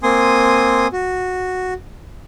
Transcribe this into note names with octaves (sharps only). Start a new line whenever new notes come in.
A#3 C4 G#5 C6 D#6
F#4